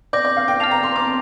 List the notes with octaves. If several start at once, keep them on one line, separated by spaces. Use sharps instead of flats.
D5 D6 G6 A#6
D5
F5
G5
A5 F6 A6 C7 F7
A#5
C6
D6